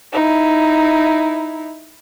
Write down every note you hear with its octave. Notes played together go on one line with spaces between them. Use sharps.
D#4 E4